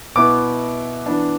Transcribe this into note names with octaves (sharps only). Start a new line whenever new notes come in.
B2 B3 E4 D6
E3 B3 D4